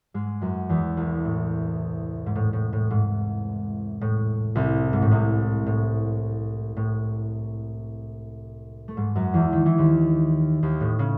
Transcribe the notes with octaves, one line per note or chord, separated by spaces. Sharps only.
G#2 G#3
F#2 F#3
E2 E3
C2 C3
A2
G#2
A2
A2
A2
G#2
A2
C2 C3
G#2
A2
C2 C3
A2
A2
A3
G#2 G#3
F#2 F#3
E2 E3
D#3
E3
D#2 D#3
D#2 D#3
A2
C#3